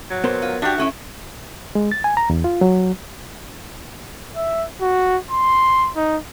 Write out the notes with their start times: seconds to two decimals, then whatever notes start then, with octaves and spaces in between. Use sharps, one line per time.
0.10 F#3
0.24 A#2 B3 A#4 C5
0.42 F4
0.62 D4 F#4 G4 E5
0.78 A3 C#4 E4
1.75 G#3
1.92 A6
2.04 G#5
2.17 A#5
2.30 E2
2.44 F4
2.61 F#3
4.36 E5
4.81 F#4
5.31 C6
5.96 D#4